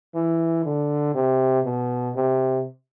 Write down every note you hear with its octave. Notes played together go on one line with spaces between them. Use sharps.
E3
D3
C3
B2
C3